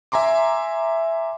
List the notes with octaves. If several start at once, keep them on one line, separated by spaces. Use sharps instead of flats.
E5 G#5 A#5 C6 D6